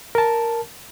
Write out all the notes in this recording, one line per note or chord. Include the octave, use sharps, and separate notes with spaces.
A#4 A5